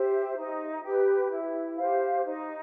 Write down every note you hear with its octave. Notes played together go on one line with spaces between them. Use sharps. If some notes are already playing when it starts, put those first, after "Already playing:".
Already playing: G4 C5 E5
D#4
G4 B4
E4
G4 C5 F5
D#4